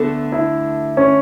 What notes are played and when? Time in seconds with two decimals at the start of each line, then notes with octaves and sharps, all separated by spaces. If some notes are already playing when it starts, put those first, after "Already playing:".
Already playing: D2 D3 A3 B3
0.32 E4
0.97 C#4